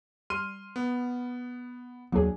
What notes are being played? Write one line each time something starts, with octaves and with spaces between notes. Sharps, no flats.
G3 C6 F6 D#7
B3
D#2 F#3 A#3 D4 G#4